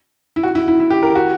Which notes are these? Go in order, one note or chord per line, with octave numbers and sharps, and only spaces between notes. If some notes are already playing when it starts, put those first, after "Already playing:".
E4
F#4
E4
E4
E4
G4
A#4
F#4